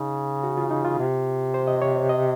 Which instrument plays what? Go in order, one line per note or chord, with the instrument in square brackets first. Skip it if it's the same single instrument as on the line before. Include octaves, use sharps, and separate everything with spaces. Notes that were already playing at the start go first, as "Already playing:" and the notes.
Already playing: [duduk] C#3 [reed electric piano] D#4
[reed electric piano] F#4
F4
D#4
F4
[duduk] C3
[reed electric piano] C5
D#5
C#5
D#5